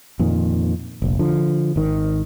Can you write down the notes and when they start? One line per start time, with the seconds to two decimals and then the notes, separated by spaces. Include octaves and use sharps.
0.19 F2 A#2 D#3
1.02 F1 A#1
1.19 D3 F3
1.76 G#1 D#3